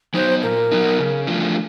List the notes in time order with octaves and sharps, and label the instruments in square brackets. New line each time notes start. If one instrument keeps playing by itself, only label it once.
[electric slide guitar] F#3 B3 D#4 [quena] C5
[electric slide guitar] A#2 [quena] A#4
[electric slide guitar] F#3 B3 D#4
C#3
F3 A3 D4 F4